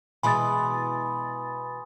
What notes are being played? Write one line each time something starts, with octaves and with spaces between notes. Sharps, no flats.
B2 E3 G#3 G#5 B5 C6 D#6 A6